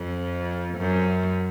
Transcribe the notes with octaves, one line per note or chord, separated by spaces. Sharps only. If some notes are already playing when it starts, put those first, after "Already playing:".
Already playing: F2
F#2